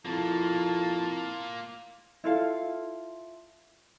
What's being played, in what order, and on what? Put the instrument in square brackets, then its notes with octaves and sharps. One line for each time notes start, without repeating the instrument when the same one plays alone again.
[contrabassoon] F2 [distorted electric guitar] A#3 F4 [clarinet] E4 [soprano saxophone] A5
[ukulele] E4 F4 A4 F5